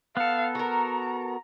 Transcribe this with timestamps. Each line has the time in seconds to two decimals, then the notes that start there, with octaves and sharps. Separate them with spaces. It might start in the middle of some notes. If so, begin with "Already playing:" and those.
0.17 B3 A4 F5
0.55 F#4 A#4 A#5